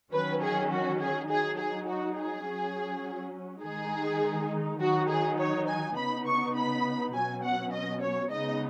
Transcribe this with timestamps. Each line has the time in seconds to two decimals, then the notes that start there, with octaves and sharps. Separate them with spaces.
0.12 D#3 F#3 C#4 B4
0.42 G#4
0.71 F#4
1.00 G#4
1.29 F#3 D#4 G#4
1.58 G#4
1.87 F#4
2.17 G#4
2.46 F#3 C#4
3.63 D#3 G#3 D#4 G#4
4.80 D#3 F#3 D#4 F#4
5.09 G#4
5.38 C#5
5.67 G#5
5.96 C#3 B3 D#4 B5
6.26 C#6
6.55 B5
7.14 B2 F#3 C#4 G#5
7.43 F#5
7.72 D#5
8.02 C#5
8.31 C#3 G#3 B3 D#4 D#5